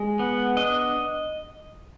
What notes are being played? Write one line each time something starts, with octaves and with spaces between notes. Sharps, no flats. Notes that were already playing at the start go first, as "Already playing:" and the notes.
Already playing: G#3
B3
D4 D#5